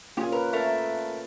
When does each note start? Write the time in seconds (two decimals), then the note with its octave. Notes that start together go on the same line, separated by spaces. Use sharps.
0.17 A#3 C#4 F4 G4 G#4
0.32 A#4 B4
0.53 A3 A#4